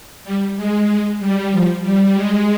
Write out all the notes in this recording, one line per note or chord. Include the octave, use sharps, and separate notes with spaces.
G3
G#3
G#3
G3
F3
G3
G#3